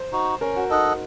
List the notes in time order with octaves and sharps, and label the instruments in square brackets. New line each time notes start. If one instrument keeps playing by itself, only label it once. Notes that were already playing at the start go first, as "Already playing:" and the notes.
Already playing: [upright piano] C5
[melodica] D#4 F#4
[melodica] C#4 [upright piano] A#4
[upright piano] F#4
[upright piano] D#4 [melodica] A4 D#5 F#5
[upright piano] D#4